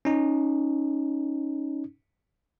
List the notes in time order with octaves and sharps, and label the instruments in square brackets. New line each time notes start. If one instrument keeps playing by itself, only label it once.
[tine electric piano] C#4 D#4